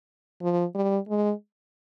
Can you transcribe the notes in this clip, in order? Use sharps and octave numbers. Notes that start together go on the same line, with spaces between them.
F3
G3
G#3